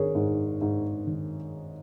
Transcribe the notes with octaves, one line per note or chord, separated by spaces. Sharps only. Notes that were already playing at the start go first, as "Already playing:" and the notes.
Already playing: G#1 G#4 A#4 C#5
G#2
G#2
D#3